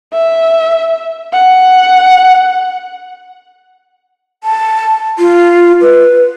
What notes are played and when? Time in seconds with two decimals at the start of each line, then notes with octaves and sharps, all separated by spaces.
0.13 E5
1.34 F#5
4.44 A5
5.19 F4
5.81 B4